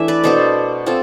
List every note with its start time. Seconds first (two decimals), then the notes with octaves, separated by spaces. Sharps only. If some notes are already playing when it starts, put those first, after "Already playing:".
Already playing: E3 A3 D4 E5
0.08 B4 D5
0.23 B2 B3 D4 A4 C5
0.86 C4 F4 A4